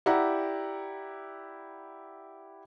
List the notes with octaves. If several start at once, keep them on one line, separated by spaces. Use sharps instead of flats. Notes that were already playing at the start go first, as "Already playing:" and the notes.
E4 G4 D5 F#5 A#5